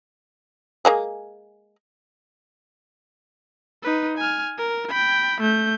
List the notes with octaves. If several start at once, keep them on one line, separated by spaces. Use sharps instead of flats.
G#3 A#3 G#4
D#4 B4
G#5 F6
A#4
G5 B5
A3 G6